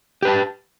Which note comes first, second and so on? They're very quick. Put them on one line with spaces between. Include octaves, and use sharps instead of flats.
G4 B4 A5